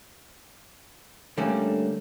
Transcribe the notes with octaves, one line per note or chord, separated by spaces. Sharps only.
D3 G3 A3 A#3 C#4 D4